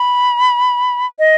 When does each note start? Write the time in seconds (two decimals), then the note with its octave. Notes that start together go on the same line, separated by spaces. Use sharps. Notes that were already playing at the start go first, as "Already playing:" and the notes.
Already playing: B5
1.19 D#5